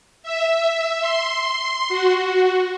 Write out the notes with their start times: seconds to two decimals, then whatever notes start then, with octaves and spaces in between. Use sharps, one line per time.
0.23 E5
1.01 C6
1.89 F#4